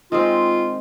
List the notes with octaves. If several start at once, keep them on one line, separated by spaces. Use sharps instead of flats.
D#3 G#3 C4 F4